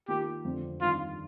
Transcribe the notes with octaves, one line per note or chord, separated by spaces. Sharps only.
D#3 A#3 F4 G4 A#4
F2 D3 F3 C4
G2 D#3 G3 D4 F4